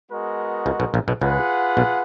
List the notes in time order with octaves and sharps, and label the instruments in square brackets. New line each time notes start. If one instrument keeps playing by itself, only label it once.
[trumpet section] G#3 B3 F#4 A#4 D#5
[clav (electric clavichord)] C#2 C#3
B1 B2
A#1 A#2
B1 B2
[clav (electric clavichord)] C#2 C#3 [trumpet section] F4 G#4 B4 F#5
[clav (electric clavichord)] B1 B2